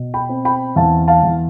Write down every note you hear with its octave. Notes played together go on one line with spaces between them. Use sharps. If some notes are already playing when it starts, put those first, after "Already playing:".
Already playing: B2
G5 B5
C4
G5 B5
E2 F5 A5
F5 A5
E2